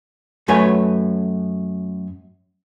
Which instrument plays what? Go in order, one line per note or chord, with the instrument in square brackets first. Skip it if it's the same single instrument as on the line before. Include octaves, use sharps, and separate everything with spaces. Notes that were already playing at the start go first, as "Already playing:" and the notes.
[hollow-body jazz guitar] F#2 A3 F#4 B4 C#5 G#5